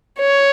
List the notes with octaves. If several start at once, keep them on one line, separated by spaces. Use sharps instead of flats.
C#5